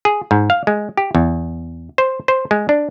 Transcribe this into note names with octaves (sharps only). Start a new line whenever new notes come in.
G#4
G#2
F5
G#3
G4
E2
C5
C5
G#3
D4